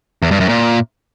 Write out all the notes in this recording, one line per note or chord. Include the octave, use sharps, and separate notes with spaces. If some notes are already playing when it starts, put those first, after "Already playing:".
E2
G2
F#2
A#2